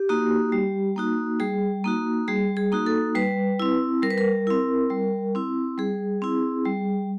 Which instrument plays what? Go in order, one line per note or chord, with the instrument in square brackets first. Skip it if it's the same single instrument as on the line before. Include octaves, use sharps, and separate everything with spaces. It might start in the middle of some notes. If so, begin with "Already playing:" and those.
Already playing: [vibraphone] G4
A#3 D#4 F#4
G3
A#3 D#4 F#4
G3 G#4
A#3 D#4 F#4
G3 G#4
G#4
A#3 D#4 F#4
A4
G3 B4
C4 E4
G3 A#4
B4
A#4
C4 E4
G3
C4 E4
G3 G#4
C4 E4
G3